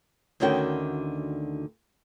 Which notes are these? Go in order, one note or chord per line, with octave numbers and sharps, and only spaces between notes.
D2 D3 D#3 C#4 F#4 G5